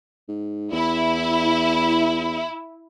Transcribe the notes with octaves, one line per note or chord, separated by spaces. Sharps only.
G#2
E2 E4